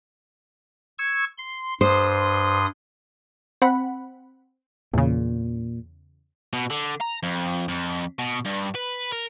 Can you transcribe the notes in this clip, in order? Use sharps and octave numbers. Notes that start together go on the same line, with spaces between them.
C#6 E6 G#6
C6
G2 C5 C6 D#6
C4 F#5 B5
E2 A#2 C#3
B2
D3
A#5
F2
F2
B2
G2
B4
A#4